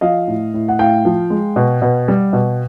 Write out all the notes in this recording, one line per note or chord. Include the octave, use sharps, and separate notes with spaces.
F3 D#5 F5
A2
A2
F#5
A2 F5 G5
F3
G#3
B2
B2
G3
B2